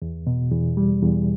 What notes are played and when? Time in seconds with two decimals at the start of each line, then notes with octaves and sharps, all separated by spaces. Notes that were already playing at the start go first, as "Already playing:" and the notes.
0.02 E2
0.27 B2
0.52 E2
0.77 G3
1.02 E2